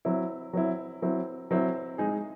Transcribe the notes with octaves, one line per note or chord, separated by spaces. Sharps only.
F#3 C4 E4
F#3 C4 E4
F#3 C4 E4
F#3 C4 E4
G#3 D#4 G#4